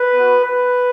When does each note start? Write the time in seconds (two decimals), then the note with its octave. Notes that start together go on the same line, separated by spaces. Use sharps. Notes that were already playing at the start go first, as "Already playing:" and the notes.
Already playing: B4
0.15 B3 F#4
0.43 B4